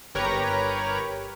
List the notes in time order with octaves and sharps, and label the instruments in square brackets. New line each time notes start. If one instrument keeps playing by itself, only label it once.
[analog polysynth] G1 G4 A#4 B4 C#5 A#5